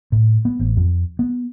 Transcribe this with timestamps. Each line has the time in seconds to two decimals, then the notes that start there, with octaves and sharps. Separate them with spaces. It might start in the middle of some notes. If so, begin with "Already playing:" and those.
0.12 A2
0.45 B3
0.59 A1
0.77 F2
1.19 B3